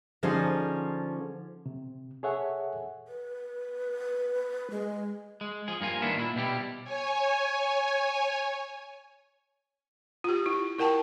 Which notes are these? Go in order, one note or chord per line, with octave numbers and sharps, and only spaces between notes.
D3 F3 C#4 D#4 G#4 C5
C3
G#4 A4 C#5 E5 F#5 G#5
B4
G#3
G#3
F3 G#4
G2 A#3 F4 G#5
D#3 A#3 B3 D4 E4
A#2 E4
B2 G3 E4 G4
C#5 G#5
F4 G4
E4
E4 A#4 F#5 G5 A5